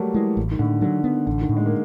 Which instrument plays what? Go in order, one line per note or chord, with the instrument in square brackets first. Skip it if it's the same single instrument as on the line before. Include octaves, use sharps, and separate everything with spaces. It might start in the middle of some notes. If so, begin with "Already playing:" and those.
Already playing: [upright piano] F#3 G3 A3 A#3
[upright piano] E3 [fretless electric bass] G#3
[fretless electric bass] A1
[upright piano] D#3
[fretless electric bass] A2 [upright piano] D3
[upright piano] D3 [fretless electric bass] F#3
[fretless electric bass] B3
[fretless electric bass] A1 [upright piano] D3
[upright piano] D#3
[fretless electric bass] A2
[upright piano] G#3
A#3